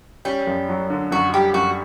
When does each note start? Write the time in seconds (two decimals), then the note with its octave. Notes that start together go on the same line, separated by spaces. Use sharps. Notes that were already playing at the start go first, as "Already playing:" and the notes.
0.25 G3 C#4
0.47 F#2
0.69 F#3
0.90 D3
1.12 F#2 F#4
1.33 G3 G4
1.54 F#2 F#4